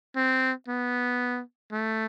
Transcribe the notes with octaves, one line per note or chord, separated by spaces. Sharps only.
C4
B3
A3